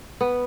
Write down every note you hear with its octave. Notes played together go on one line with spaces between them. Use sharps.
B3